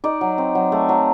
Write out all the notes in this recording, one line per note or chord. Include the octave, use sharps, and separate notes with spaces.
D#4 D5
F#3
C4
F#3
A3
F#3